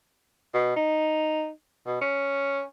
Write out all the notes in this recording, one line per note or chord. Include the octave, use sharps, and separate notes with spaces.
B2
D#4
B2
C#4